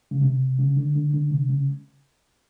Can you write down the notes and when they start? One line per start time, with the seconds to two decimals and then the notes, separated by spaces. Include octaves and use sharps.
0.11 C#3
0.21 C3
0.59 C#3
0.76 D3
0.95 D3
1.13 D3
1.31 C3
1.49 C#3